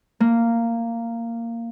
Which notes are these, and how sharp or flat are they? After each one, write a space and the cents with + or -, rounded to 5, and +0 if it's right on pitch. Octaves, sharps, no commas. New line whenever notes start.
A#3 -10